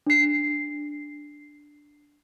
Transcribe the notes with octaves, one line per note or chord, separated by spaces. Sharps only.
D4 C7